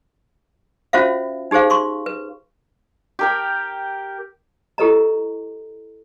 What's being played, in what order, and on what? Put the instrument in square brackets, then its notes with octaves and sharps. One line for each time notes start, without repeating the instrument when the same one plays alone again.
[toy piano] C#4 F4 F#4 C5 E5 F5
D#4 G4 G#4 C5 F5
C6 C#6
B4
[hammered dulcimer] G4 A#4 G5
[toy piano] E4 G4 A4 B4 D#5 A#5